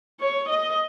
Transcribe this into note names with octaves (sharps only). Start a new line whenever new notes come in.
C#5
D#5